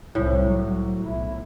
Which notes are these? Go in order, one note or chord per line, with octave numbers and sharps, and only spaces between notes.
C2 A2
F#3
B1 E4